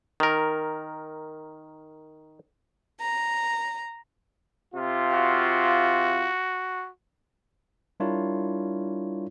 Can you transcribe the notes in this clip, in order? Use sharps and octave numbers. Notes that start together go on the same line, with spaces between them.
D#3 A#4
A#5
C3 F4
F#4
G3 D4 E4 F4 A#4 C#5